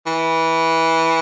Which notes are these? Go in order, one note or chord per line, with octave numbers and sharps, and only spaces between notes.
E3